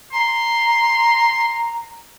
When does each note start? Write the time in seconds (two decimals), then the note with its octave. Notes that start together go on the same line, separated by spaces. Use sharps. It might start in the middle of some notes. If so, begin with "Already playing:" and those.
0.13 A#5 C6